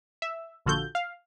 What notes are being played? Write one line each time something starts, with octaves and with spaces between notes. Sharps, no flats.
E5
A#1 D3 F4 F#4 A4 G6
F5